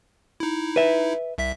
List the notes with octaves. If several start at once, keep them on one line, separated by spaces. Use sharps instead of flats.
D#4 E4
B4 E5
C2 E5 B6